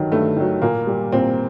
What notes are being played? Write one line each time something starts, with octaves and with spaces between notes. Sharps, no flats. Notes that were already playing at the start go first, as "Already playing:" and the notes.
Already playing: G2 D#3 F#3
G2 A3
D#3 F#3
A#2 A#3
G3
A#2 C4